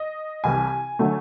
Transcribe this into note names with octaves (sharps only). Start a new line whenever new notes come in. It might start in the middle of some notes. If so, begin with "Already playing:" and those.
Already playing: D#5
C2 C3 E3 G3 G#5
D3 F#3 A3